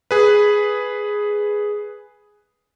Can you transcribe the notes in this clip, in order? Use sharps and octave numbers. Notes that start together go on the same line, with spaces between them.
G#4 B4